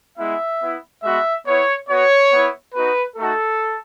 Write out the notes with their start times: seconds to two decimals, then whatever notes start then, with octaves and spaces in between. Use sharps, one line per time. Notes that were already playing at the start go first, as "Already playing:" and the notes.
0.18 G#3 B3 E4 E5
0.60 B3 E4
1.03 G#3 B3 F#4 E5
1.46 B3 E4 C#5
1.88 B3 F#4 C#5
2.31 B3 E4
2.74 B3 D#4 F#4 B4
3.16 A3 D#4 F#4 A4